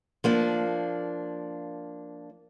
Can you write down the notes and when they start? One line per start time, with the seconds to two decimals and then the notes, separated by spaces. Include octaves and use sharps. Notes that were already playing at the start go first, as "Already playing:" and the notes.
0.24 F3 A#3 D4